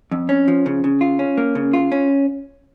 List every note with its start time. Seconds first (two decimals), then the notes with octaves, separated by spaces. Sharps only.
0.11 F2
0.29 C#4
0.48 F3
0.66 C#3
0.84 C#3
1.01 F4
1.19 C#4
1.38 A#3
1.55 C#3
1.73 F4
1.92 C#4